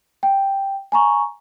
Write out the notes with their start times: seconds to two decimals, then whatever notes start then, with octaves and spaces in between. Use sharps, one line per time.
0.23 G5
0.92 G#5 A#5 C#6